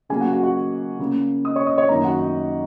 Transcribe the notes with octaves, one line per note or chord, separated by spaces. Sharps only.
C#3 F#3 A#3 G#4 G#5
F#4 F#5
F#4 F#5
F#4 F#5
C#3 A#3
D#5 D#6
C#5 C#6
D#5 D#6
C#5 C#6
F#2 D#3 A#3 A#4 A#5
F#4 F#5
D#4 D#5